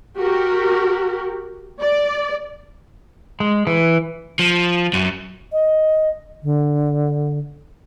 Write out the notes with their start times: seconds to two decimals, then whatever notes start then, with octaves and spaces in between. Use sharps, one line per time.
0.17 F#4 G4 A#4
1.80 D5
3.40 G#3
3.67 E3
4.39 F3
4.93 F#2
5.53 D#5
6.43 D3